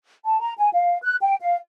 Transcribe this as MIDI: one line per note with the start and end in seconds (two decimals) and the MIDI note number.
0.25 0.40 81
0.41 0.53 82
0.58 0.68 80
0.74 0.98 77
1.03 1.16 90
1.21 1.36 79
1.41 1.57 77